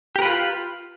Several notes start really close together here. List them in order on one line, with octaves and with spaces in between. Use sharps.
G4 A#4 B4 F4